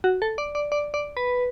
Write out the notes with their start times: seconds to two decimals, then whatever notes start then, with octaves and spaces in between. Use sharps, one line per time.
0.04 F#4
0.22 A4
0.38 D5
0.55 D5
0.72 D5
0.94 D5
1.17 B4